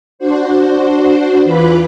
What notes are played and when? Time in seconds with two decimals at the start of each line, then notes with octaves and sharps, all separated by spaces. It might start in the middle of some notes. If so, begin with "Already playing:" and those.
0.19 D4 F#4 C5
1.44 E2 E3 F4 B4 B5 D6